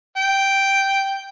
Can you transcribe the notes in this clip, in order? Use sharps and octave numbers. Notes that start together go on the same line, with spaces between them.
G5